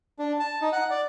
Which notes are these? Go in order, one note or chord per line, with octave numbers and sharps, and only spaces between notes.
D4
A5
D#4
F#5
D5